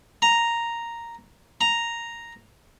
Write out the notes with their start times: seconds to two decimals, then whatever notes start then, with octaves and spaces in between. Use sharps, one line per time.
0.22 A#5
1.61 A#5